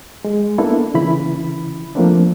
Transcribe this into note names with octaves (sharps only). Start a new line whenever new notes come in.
G#3
A#3 B3 D4 E4 A4
C#3 E3 E4 B5
F3 A3 A#3 C4 D4